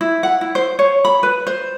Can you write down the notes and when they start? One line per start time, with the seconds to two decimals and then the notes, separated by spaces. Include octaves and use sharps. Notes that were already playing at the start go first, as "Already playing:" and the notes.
0.01 E4
0.23 F#5
0.41 E4
0.55 C5
0.79 C#5
1.05 B5
1.23 B4
1.47 C5